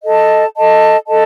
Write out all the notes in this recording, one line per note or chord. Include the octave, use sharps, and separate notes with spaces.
A4 D#5 A5
A4 D#5 A5
A4 D#5 A5